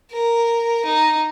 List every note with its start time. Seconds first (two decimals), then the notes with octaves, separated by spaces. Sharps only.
0.12 A#4
0.85 D#4